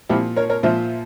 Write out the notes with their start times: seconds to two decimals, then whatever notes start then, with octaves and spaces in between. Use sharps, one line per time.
0.09 A#2 F3 E4 G4
0.36 A#4 C#5
0.50 A#4 C#5
0.63 A#2 F3 C5 E5